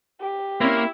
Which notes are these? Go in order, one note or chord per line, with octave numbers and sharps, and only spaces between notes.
G4
A#3 C4 C#4 E4